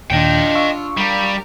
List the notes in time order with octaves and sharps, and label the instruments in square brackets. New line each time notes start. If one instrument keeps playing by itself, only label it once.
[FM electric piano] D#2 A#2 D#3 [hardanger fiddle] D4 F4 [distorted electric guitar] D#5 G5
[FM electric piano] F5 C#6 E6
[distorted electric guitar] G3 [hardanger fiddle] A#4